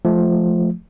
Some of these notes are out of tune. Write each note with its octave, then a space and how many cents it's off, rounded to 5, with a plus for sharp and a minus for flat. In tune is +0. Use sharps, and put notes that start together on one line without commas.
F3 +0 A3 -20